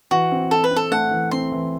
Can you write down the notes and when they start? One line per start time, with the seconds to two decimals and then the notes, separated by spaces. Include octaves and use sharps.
0.11 E3 F#4
0.32 C4
0.51 C4 A4
0.64 B4
0.71 C4
0.76 A4
0.92 A3 F#5
1.11 E3
1.31 C4 C6
1.52 E3